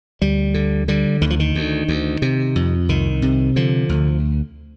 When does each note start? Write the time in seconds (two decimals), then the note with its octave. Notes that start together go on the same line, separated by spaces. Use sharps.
0.22 D2 G3
0.54 D3
0.88 D3 G3
1.22 D2 D#3
1.30 F3
1.40 D#3
1.55 D2
1.88 D2
2.22 C3
2.56 F2
2.89 C2 D#3
3.22 C3
3.56 D3 F3
3.89 D2